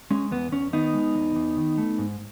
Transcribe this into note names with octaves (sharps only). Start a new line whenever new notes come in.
G#3 C#4
E2 B3
E2 C#4
D#3 B3 D#4
G#3
E2
E2
D#3
A3
G#2